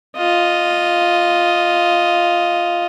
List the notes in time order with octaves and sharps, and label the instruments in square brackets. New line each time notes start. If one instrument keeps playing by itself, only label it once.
[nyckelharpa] F4 D#5